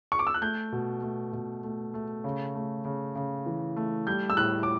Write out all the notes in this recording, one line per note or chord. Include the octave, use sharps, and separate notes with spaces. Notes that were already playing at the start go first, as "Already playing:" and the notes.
C#6
D6
E6
F#6
A3 G6
B2
A3
B2
A3
A3
C#3
A3
C#3
C#3
E3
A3
G3 G6
E6
A2 F#6
D6